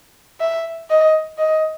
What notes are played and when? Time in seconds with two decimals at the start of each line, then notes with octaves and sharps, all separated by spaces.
0.40 E5
0.90 D#5
1.38 D#5